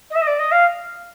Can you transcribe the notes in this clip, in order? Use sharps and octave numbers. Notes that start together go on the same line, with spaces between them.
D#5
E5
D#5
D5
D#5
F5